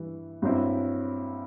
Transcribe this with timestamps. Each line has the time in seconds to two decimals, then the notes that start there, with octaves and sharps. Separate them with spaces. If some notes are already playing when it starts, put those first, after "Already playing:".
Already playing: G2 E3 E4
0.42 G2 F#3 C4 E4